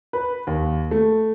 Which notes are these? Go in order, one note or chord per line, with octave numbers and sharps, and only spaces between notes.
B4
D#2
A3